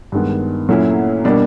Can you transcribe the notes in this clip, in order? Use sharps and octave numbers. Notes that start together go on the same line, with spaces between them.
G2 D#3 G#3 B3
A#2 F#3 A3 C#4 E4
B2 G3 A#3 D4